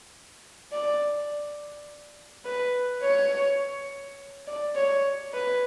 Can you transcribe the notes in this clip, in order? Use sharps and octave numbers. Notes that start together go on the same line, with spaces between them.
D5
B4
C#5
D5
C#5
B4